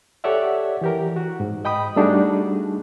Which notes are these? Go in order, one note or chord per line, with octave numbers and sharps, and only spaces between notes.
G4 A4 C#5 D5 E5 F#5
E3 G4 A#4
F#4
G#2
D#5 G5 B5 D#6
G3 A3 D4 D#4 F#4 G#4